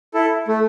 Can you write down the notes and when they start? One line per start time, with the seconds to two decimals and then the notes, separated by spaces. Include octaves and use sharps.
0.14 E4 A4
0.48 A3